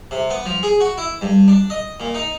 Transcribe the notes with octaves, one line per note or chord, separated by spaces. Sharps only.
C3
B3
F3
G#4
F#4
E4
G2
D4
D#5
A#2
D#4